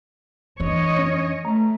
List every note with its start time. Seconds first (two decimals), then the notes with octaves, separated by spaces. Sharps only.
0.60 E3 D4 C#5 D#5
0.96 F2 C#4
1.45 A3 A#5